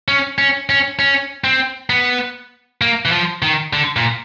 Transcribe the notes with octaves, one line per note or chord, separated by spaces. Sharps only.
C#4
C#4
C#4
C#4
C4
B3
A#3
E3
F3
D#3
D3
A#2